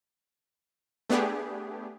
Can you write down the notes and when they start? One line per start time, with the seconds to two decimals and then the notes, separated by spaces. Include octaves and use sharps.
1.10 A3 B3 D4 G4 G#4